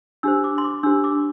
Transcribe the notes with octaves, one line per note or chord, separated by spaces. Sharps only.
D4 G4 C5 E6
D6
C6
D6
D4 G4 C5 E6
D6